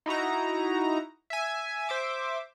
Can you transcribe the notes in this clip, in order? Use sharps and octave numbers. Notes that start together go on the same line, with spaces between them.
D#4 E4 F#4 A#5
E5 G#5
C5 E5 D6